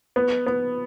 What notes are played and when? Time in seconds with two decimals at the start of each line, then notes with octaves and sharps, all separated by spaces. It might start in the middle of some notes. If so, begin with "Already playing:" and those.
0.16 B3
0.47 B3